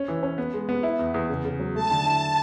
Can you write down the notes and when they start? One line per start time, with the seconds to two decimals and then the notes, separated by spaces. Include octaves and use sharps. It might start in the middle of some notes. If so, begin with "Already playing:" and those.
Already playing: C#4
0.08 E3
0.23 C#4
0.38 B3
0.53 G#3
0.69 B3
0.83 E4
0.99 E2
1.14 E2
1.29 C#3
1.45 C#3
1.59 F#3
1.75 A3 A5
1.91 D3
2.05 E4